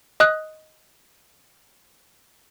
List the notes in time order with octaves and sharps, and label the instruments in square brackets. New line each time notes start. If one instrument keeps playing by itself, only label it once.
[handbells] D#5 D#6 F#6